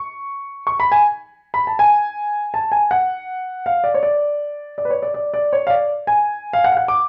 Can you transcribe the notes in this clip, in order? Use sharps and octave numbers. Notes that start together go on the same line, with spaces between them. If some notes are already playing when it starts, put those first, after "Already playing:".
Already playing: C#6
C#6
B5
G#5
B5
A5
G#5
A5
G#5
F#5
F5
D5
C#5
D5
D5
B4
C#5
D5
D5
D5
C#5
F5
D5
G#5
F5
F#5
F5
F#5
D6